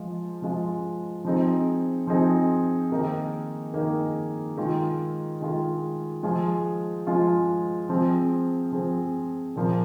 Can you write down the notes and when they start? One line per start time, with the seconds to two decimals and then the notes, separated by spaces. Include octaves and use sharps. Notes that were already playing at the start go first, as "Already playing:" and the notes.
Already playing: F3 G#3 F4
0.42 F3 G#3 F4
1.25 F3 C4 D#4 G#4
2.07 F3 C4 D#4 G#4
2.91 D#3 A#3 D#4 G#4
3.74 D#3 A#3 D#4 G#4
4.57 D#3 G#3 F4 G#4
5.41 D#3 G#3 F4 G#4
6.23 F3 G#3 F4 G#4
7.07 F3 G#3 F4 G#4
7.89 F3 C4 G#4
8.72 F3 C4 G#4
9.56 A#2 F3 A#3